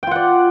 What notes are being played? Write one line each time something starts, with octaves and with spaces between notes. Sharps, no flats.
F4 D5 F#5 G5